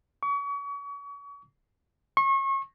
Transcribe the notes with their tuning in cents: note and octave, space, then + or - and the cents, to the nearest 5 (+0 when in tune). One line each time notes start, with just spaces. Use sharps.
C#6 +35
C#6 -35